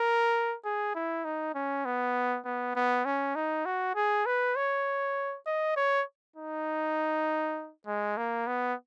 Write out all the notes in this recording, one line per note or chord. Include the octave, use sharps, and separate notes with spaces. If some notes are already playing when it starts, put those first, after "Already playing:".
Already playing: A#4
G#4
E4
D#4
C#4
B3
B3
B3
C#4
D#4
F#4
G#4
B4
C#5
D#5
C#5
D#4
G#3
A#3
B3